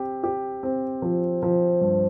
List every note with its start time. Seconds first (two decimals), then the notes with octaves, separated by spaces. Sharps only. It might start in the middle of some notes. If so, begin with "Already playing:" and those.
Already playing: C4 G4
0.24 G4
0.63 C4
1.02 F3
1.43 F3
1.81 G2